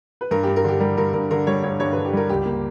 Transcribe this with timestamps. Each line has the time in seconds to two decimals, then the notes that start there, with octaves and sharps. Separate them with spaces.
0.21 B4
0.31 G2 A#4
0.43 G4
0.47 G2
0.56 A#4
0.64 D3 G4
0.80 G3 A#4
0.97 G2 A#4
1.14 G2 A#4
1.31 D3 A#4
1.47 G3 C#5
1.63 G2 C#5
1.79 G2 C#5
1.92 B4
1.97 D3
2.05 G4
2.13 G3 A#4
2.29 C#2 G4
2.46 A#3